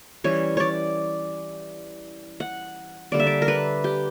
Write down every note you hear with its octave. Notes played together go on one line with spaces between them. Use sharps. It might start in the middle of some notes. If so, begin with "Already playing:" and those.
E3 G3 C#4 C#5
C#5 D5
F#5
D3 G3 A#3 D4 D5
E5
D5
A#4
B4
G4